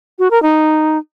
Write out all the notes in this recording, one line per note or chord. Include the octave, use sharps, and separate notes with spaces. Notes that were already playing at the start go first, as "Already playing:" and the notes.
F#4
A#4
D#4